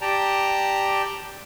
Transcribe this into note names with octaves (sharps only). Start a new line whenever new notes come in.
G4 D5 G5 A5 A#5